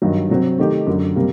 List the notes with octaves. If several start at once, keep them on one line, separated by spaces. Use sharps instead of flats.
G2 D#3 F#3
C3 F#3 C4 F#4
D#3 A3 D#4 G4
F#2 D3 F#3
C3 G3 A#3